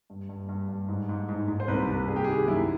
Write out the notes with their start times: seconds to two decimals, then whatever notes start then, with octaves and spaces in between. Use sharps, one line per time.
0.10 G2
0.29 G2
0.49 G2
0.69 G2
0.88 G#2
1.09 G#2
1.29 G#2
1.48 G#2
1.60 C5
1.68 C2 B4
1.89 C2
2.08 C2 G#4
2.16 G4
2.24 D#3 G#4
2.48 F#2 E4